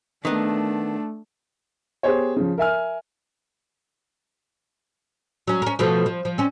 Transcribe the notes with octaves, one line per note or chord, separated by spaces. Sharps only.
D#3 A3 B3 D4
B3 G4 G#4 C5 C#5
C#3 F3
A#4 E5 G#5 F6
F#3 C#4
C#4 A#4
B2 F3 A3
F3
F3
C4 C#4